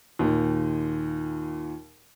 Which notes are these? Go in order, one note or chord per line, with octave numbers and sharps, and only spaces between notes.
D#2 A#2 D#3